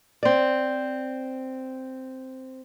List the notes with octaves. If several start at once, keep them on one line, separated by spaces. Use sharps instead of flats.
C4 D5